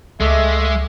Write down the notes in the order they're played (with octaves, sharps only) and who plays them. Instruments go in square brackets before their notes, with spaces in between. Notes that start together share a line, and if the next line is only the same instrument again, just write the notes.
[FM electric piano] C#2 D6 B6 [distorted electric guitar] G#3 [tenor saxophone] A3 [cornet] E5